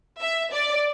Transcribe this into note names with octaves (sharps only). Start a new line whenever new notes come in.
E5
D5